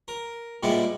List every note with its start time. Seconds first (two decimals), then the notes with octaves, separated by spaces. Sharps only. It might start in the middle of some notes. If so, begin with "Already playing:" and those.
0.08 A#4
0.63 A#2 G3 G#3 B3 E4